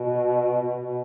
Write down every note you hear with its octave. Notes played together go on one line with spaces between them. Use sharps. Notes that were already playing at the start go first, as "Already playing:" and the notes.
Already playing: B2
B2
B2